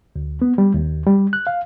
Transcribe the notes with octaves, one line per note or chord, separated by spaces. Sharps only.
D2
B3
G3
D#2
G3
F#6
F5